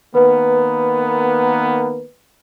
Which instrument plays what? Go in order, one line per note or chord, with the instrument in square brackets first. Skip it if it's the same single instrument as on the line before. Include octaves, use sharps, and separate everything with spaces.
[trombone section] D#3 A#3 B3 [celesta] B4